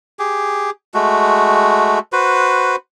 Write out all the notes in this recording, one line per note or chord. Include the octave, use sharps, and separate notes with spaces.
G4 G#4
G#3 A3 F#4
F#4 B4 C5